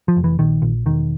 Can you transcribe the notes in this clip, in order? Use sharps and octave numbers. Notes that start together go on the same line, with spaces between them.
F3
F1
E3
A#1 D#3
A#1
E1 D#3